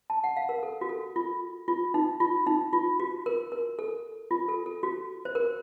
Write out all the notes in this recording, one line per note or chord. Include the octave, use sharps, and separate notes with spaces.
A5
F#5
F5
A#4
A4
F#4
A4
F4
F4
D#4
F4
D#4
F4
F#4
A#4
A#4
A4
F4
A4
A4
F#4
C5
A#4